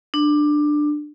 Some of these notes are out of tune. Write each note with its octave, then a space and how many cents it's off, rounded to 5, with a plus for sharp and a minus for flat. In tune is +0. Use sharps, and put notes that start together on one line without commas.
D4 +15